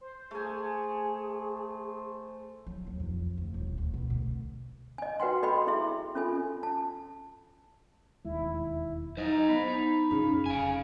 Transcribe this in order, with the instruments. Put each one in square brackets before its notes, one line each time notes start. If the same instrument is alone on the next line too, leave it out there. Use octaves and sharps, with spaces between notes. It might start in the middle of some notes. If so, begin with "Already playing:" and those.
[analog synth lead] C5
[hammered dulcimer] A3 G#5 [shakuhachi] G#4
[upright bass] F#3
D#2
F2
D2
D#1
D2
B2
D2
[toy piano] D#5 G#5
F#4 B4 F#5 G5 C6
A4 D#5 G5 B5 C6
E4 G#4 E5 C6
C#4 F4 A4 G#5
A5
[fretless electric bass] E1 D#2 G#3 [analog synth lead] E4
[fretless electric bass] F#3 [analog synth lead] D#4 [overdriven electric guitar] C5 D#5
[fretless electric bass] B3 [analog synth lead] B5
[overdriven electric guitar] D#4
[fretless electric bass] F#2 [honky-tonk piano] C#3
[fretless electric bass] F1 [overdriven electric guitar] F5 G#5